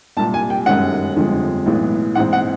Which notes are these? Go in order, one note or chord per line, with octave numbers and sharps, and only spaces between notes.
C2 A#2 G3 A5
G#5
G5
G1 F#2 D#3 G#3 C#4 F#5
G1 F2 D3 F3 G#3
B1 A2 E3 G#3 B3
A#1 G#2 E3 G#3 C4 F#5
F#5